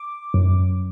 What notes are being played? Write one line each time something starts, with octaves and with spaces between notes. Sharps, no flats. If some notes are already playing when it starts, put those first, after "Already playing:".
Already playing: D6
F#2